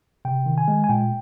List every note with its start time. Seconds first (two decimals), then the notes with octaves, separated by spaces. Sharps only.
0.25 C3 G5
0.46 D#3
0.58 G#5
0.68 G#3
0.84 G#5
0.89 A#2 G5